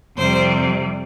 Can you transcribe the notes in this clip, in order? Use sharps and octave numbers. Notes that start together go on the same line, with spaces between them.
F2 C3 G3 C5